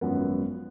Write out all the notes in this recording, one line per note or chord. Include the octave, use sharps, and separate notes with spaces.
G#1 F#2 F3 B3 F#5